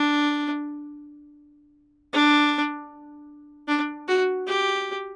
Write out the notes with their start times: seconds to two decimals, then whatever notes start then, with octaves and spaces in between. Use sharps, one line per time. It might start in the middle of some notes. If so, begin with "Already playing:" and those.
Already playing: D4
2.13 D4
3.68 D4
4.08 F#4
4.47 G4